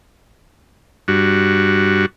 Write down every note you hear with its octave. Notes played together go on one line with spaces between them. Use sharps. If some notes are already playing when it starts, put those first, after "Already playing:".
G2 F#4